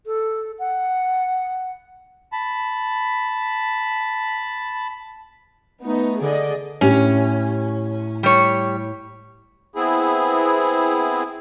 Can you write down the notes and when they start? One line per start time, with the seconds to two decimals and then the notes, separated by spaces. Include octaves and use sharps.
0.06 A4
0.59 F#5
2.32 A5 B5
5.83 A3 B3 D#4
6.21 D3 G#4 D5 D#5
6.81 A2 C#4 G4
8.23 G3 C#5
9.75 B3 C4 E4 G#4